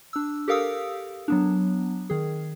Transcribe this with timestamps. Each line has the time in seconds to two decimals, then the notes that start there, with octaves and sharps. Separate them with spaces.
0.13 D4 E6
0.48 G4 A4 A#4 F5 D#6 E6
1.28 F#3 B3 D4
2.10 D#3 G#4